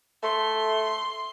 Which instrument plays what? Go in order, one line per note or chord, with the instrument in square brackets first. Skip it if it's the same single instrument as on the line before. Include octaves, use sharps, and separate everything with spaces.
[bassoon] A3 [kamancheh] C6